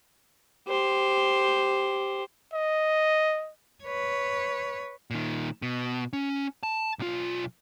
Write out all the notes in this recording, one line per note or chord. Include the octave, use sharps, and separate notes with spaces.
G4 C5
D#5
B4 C#5
A#2 D#3
B2
C#4
A5
B1 F4